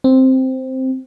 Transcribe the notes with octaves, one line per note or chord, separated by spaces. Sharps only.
C4